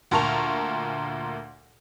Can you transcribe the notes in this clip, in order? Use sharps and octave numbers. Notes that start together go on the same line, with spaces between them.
D2 A#2 A#4 A5 C#6 F7